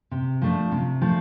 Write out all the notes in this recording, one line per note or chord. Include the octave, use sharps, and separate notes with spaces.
C3
F3 A3 D4
C3
F3 A3 D4